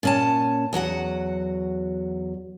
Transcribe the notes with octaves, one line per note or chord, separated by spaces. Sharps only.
A#2 C#4 A5
E2 F#3 F#4 F#5